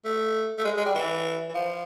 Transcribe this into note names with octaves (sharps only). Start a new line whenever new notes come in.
A3
A3
G#3
G#3
G3
E3
E3
F3